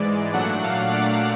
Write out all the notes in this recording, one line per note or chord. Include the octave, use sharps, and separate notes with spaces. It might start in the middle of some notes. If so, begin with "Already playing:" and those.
Already playing: G#2 E3 G#3 D5
A#2 F#3 A3 D4 F#5
F5
D5